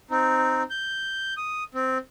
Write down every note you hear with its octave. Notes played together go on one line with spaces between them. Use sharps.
C4 D#4
G6
D#6
C4